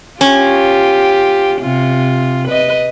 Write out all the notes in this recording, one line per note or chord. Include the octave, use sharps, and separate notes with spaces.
C#4 F4 G4
C3 F4
B4 D#5